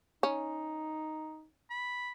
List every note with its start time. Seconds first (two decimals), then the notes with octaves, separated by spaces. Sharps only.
0.23 C#4 D#4
1.70 B5